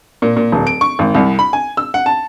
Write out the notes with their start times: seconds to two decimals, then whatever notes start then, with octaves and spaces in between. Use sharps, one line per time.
0.22 A#2
0.36 A#2
0.52 D1
0.67 D7
0.81 C#6
0.99 G#1
1.15 C2
1.39 B5
1.53 G#5
1.77 E6
1.94 F#5
2.06 A5